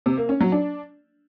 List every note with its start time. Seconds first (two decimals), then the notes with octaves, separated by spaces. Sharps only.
0.06 C3
0.17 A#3
0.29 C#4
0.41 F#3
0.52 D4